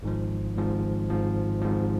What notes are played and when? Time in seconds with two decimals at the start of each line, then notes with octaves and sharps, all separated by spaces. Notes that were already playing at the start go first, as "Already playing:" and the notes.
0.03 G#1 G#2 F3
0.56 G#1 G#2 F3
1.10 G#1 G#2 F3
1.62 G#1 G#2 F3